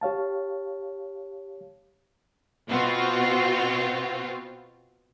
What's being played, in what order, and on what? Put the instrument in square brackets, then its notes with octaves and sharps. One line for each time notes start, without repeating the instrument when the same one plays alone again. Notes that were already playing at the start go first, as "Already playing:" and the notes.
[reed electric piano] G4 C#5 F5 A5
[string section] B2 C4 F4 F#4